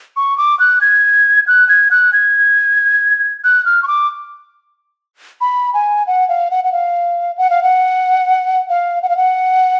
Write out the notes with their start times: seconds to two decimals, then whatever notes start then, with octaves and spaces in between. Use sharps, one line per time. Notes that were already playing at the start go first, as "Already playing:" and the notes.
0.17 C#6
0.38 D6
0.60 F#6
0.81 G#6
1.47 F#6
1.69 G#6
1.91 F#6
2.13 G#6
3.44 F#6
3.65 F6
3.83 C#6
3.88 D6
5.41 B5
5.74 G#5
6.07 F#5
6.29 F5
6.51 F#5
6.64 F#5
6.72 F5
7.38 F#5
7.50 F5
7.63 F#5
8.69 F5
9.03 F#5
9.09 F5
9.17 F#5